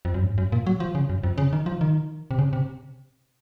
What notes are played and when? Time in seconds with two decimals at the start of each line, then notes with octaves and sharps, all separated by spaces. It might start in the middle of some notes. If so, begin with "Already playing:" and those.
0.05 F2
0.14 F#2
0.24 G#2
0.38 F#2
0.52 A#2
0.67 F#3
0.80 F3
0.95 C#3
1.10 F#2
1.23 F2
1.38 C#3
1.53 D#3
1.66 F3
1.81 D#3
2.31 C3
2.39 C#3
2.53 C3